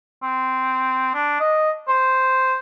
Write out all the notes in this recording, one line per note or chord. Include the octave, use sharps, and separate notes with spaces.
C4
D4
D#5
C5